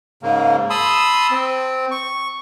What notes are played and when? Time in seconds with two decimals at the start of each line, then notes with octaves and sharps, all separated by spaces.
0.23 G#2 C#3 A#3
0.70 A5 B5 C6 D#6 E6
1.31 C4
1.91 C#6